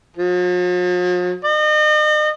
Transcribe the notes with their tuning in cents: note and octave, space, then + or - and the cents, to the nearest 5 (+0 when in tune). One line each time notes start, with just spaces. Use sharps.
F3 +45
D#5 -40